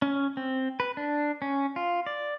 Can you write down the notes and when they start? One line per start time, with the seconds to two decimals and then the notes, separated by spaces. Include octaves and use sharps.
0.02 C#4
0.37 C4
0.80 B4
0.97 D4
1.42 C#4
1.76 F4
2.06 D5